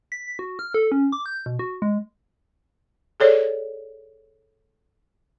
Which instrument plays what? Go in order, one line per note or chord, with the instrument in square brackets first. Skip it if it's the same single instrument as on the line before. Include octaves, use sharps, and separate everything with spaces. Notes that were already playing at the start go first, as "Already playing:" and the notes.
[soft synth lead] B6
F#4
F6
A4
C#4
D6
G6
B2
F#4
G#3
[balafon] G#4 A4 C#5 D5